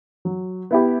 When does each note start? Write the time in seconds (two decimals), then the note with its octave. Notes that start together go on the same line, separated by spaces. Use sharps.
0.25 F#3
0.71 B3 E4 G4